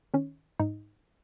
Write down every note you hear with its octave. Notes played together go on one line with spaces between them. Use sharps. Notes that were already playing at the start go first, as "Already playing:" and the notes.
D#3 C#4
G#2 D#4